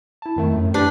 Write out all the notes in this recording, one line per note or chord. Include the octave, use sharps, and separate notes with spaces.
E4 A5
F2 D#3 A3
F#2 A2
D4 G4 B4